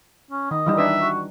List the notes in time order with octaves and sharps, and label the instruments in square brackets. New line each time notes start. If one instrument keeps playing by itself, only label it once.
[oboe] C#4
[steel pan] D#3 [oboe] D#5
[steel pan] E3 G3 D#4
[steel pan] D4 D#4 B4 [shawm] E5
[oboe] F#4